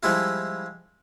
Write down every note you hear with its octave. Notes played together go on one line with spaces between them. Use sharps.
F3 G3 G#3 E4 F4